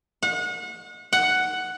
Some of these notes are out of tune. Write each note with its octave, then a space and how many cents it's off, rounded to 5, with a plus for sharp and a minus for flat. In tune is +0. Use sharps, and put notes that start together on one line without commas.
F#5 -35
F#5 +5